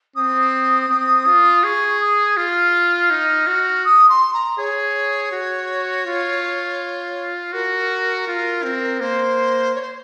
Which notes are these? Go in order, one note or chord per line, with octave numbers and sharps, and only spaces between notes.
C4 D#6
C4
F4
G#4 C#6
C#6
D#6
F4 F6
D#4
F#4
D#6
C6
A#5
G#4 C#5
F#4
F4
F#4 A#4
F4
C4
A#3 C5
C#5
C5